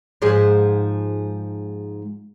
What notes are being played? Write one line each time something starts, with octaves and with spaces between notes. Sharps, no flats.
G#2 F3 G#3